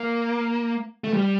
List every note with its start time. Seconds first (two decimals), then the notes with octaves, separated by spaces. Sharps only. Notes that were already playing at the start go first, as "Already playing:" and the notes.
Already playing: A#3
1.04 A3
1.13 G3